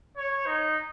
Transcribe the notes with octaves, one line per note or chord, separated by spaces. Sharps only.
C#5
D#4